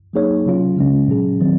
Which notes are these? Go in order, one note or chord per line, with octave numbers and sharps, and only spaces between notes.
F#3 A#3 D#4 G#4 C#5
C3 F#3 C#4 F4
C#3 G#3 C#4
A#2 F#3 C#4 G#4
D#3 F#3 C4